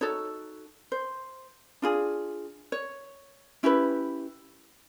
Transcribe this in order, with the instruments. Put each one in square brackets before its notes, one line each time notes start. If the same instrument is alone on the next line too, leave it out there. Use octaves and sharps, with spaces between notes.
[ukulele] D#4 F#4 A4 C#5
C5
D4 F4 G#4
C#5
C#4 E4 G4 B4